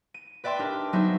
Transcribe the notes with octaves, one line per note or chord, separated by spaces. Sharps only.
D#7
B4 D5 E5 G5 C6
D4 G4 A#4
F#3 B3 D#4 G#4 C5 E5